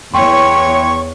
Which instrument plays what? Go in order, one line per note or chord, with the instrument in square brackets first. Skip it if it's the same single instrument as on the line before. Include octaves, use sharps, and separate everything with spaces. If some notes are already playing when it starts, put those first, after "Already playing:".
[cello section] E2 C#5 [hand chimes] G5 C6 [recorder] C#6